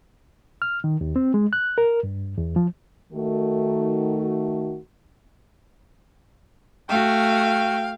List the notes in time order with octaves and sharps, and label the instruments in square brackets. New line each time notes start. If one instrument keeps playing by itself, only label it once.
[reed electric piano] F6
D#3
D#2
C4
G#3
F#6
A#4
G2
E2
F3
[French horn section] D#3 A3 F#4
[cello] A3 F#4 [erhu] F5 [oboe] G5